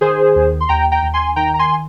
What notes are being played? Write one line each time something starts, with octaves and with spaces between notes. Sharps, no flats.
D#3 G#4 C5
D#2
C6
D#2 G5 A#5
G5 A#5
D#2
G#5 C6
D#3 G5 A#5
A#5
G#5 C6